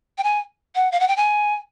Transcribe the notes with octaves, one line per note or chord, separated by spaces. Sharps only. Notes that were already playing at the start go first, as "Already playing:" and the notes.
G5
G#5
F#5
F5
F#5
G5
G#5